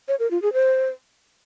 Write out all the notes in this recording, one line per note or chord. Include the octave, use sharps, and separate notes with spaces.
C#5
A#4
F4
G#4
C5